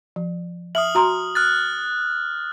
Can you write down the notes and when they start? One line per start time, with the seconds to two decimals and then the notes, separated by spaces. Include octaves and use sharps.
0.16 F3
0.75 E5 D#6 F6 F#7
0.95 F#4 A#5 C6
1.35 F6 F#6 A6